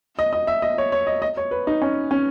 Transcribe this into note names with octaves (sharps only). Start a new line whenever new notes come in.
D#5
D#5
E5
D#5
C#5
C#5
D#5
D#5
C#5
B4
D#4
C#4
C#4